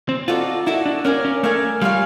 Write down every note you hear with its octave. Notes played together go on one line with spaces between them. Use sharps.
C4
D#4 F4 F#4 A4 D5
D#4 E4 F#4 A4 D5
D4
C#4 A#4 D5 F5 G#5
C#4
A3 A#4 D5 F5 G#5
G3 F4 G#4 C#5 F5